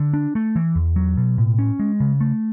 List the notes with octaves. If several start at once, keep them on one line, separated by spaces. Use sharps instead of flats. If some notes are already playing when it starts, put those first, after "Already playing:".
Already playing: D3
D4
A3
E3
E2
F#3
B2
A2
C#4
G#3
C#3
A3